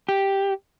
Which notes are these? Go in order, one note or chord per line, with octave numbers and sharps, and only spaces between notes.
G4